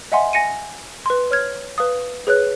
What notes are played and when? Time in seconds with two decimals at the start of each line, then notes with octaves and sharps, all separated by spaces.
0.12 D#5 E5 F#5 G#5 C6
0.33 G#5 A#6 C#7 D#7
1.06 B4 C6
1.31 C#5 F6 G#6
1.78 B4 F5 D#6
2.27 G#4 B4 C#5 F#6